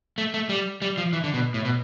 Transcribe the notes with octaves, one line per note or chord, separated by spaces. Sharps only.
A3
A3
G3
G3
F3
E3
D3
B2
A2
B2